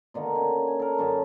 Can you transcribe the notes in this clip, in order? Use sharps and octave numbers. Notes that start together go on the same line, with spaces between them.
B2 D3 D#3 A#3
C#4
G#5
A4 A#4
F#2 D3 C#4 A5